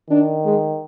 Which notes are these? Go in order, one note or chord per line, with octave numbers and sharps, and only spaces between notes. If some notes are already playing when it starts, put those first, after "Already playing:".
D#3 D4
G#3